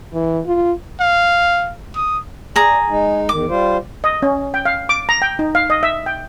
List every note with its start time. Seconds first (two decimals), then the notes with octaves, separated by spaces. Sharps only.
0.14 E3
0.46 F4
1.00 F5
1.96 D#6
2.56 G#4 D5 A#5
2.90 G#3 D#4
3.29 E2 D#3 D6
3.49 G3 F4 C5
4.04 D#5
4.22 C#4
4.54 G5
4.65 F5
4.89 D6
5.09 A#5
5.22 G5
5.39 D#4
5.55 F5
5.70 D#5
5.83 E5
6.06 G5